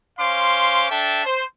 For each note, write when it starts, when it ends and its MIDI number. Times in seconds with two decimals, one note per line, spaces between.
0.18 0.87 61
0.18 0.87 72
0.18 0.87 77
0.18 0.87 84
0.18 0.87 86
0.90 1.24 62
0.90 1.24 69
0.90 1.24 76
0.90 1.24 79
0.90 1.24 81
1.25 1.45 72